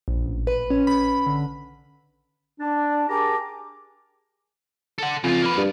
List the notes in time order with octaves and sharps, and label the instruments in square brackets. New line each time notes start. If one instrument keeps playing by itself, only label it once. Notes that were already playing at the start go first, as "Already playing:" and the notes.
[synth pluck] A#1
A1
B4
C#4
B5
D3
[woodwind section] D4
G4 G#4 A#4 A5 A#5 D6
[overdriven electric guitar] A4 F#5
[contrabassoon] F2 [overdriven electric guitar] C#3 F4
[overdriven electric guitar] A#3 B4
[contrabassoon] G2